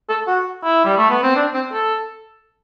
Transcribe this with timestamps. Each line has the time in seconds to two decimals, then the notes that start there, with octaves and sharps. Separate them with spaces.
0.09 A4
0.27 F#4
0.64 E4
0.85 G3
0.98 A3
1.10 B3
1.23 C4
1.36 D4
1.54 C4
1.72 A4